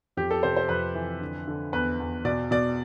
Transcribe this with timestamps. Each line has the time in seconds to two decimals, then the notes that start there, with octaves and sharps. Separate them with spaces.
0.17 F2 G4
0.31 A4
0.43 C3 C5
0.56 C5
0.69 F2 B4
0.95 E3
1.21 D3
1.47 D3
1.73 E2 B4
2.00 E2
2.25 B2 D5
2.51 B2 D5